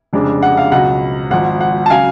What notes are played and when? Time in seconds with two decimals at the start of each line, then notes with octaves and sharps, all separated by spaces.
0.13 F1 F2 C#3 G#3 D4
0.43 F#5
0.57 F5
0.72 C#2 B2 F#3 F#5
1.31 G#1 G#2 F3 F#5
1.61 F#5
1.86 A5
1.90 C#3 F#3 F5 G#5